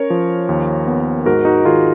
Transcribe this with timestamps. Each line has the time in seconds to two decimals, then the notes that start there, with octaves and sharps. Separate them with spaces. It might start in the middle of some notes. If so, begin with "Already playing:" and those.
Already playing: C#4 A#4 C#5
0.10 F3
0.49 D#2
0.87 B3
1.26 G#2 F#4 A#4
1.45 D#4 F#4
1.65 D#3 F4 G#4